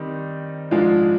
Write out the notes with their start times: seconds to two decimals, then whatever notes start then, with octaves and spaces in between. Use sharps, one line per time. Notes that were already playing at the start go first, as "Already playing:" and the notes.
Already playing: D#3 G3 C4 D#4
0.71 G#2 F3 G#3 D4 F4